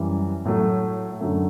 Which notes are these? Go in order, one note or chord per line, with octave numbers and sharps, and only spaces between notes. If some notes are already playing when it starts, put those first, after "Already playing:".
Already playing: F#2 E3 G3
A2 F#3 A3
F#2 D3 F#3 A3